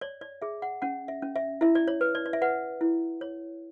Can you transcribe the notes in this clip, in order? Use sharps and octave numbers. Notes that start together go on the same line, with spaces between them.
C#5 D5
D5
G#4 E5
F#5
C#4 F#5
E5
C#4
E5
E4 E5
D5
C#5
B4
D5
D5
E5
B4 F#5
E4
C#5